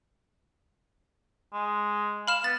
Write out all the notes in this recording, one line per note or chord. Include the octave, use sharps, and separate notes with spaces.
G#3
F5 B5 F6 E7
B3 A6